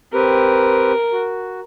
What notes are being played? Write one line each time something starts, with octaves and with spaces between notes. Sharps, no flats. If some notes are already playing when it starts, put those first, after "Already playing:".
C4 G4 A#4 B4
F#4